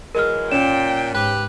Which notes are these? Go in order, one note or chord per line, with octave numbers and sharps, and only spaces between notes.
E3 F#3 G#3 A#4 F6
A#2 C#4 G5 E7
G#2 G4 B4